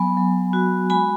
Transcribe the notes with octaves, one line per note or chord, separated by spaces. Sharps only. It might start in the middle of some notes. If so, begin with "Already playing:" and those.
Already playing: F#3 B3 G#5 B5
F#3
F#4
G#3 G#5 B5